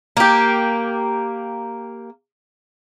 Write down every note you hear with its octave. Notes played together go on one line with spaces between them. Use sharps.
A#3 G4